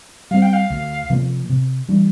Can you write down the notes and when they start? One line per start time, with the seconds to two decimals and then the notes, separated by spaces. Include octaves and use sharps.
0.31 G3 C4 F5
0.42 G5
0.53 F5
0.70 D2
1.10 C3 F3 A#3
1.49 C3
1.89 E3 G3 D4